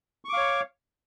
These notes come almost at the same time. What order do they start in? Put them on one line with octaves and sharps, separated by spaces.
C#6 D6 F5 C#5